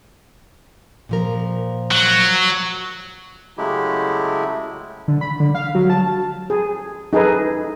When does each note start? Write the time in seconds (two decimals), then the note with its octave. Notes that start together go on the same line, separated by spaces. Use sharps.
1.09 A#2 F3 A#4
1.91 F#3
3.58 C#3 F#3 G#3 A3 E4 G4
5.08 D3
5.21 B5
5.40 D3
5.55 F5
5.75 F#3
5.90 A5
6.50 G#4
7.13 D#4 G#4 A4 B4